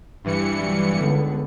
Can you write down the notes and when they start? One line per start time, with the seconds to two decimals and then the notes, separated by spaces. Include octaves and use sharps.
0.24 G2 E3 C#7
0.55 C3 F#3 G3
0.96 C#2 D3 B3